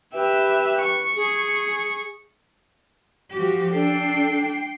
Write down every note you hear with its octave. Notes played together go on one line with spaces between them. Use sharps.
G4 B4 E5
C#6
G#4
F3 F#4 G4
D4 A4 G5 C7